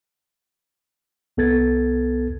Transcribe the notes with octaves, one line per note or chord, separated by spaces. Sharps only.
C2 B3 A4 G#6 A6